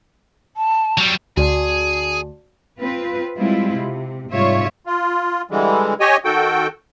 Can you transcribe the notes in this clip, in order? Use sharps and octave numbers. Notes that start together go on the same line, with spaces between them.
A5
F#3 G3
D2 F#4 G#4 D5 A5
C4 F4 B4
G3 G#3 C4 E4 F4
C3
G#2 C3 G3 F4 C#5 E5
F4
D3 E3 G3 G#3
G4 C#5 D#5 G#5
D#3 F#4 A4 G5